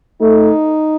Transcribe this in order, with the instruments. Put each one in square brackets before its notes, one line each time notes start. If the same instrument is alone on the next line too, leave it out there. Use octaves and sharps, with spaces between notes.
[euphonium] A3 [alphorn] D#4